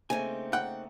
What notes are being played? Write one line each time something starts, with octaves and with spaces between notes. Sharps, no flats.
C#3 A3 A#3 C4 D#4 G#5
F#5 G5